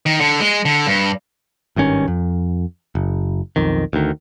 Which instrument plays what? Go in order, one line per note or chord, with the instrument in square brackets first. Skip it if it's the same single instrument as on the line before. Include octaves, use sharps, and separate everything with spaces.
[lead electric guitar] D#3
D3
G#3
D3
G2
[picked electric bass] G#1 G2 D#3 C#4
F2
F#1
B1 F2 D#3
D2 D#3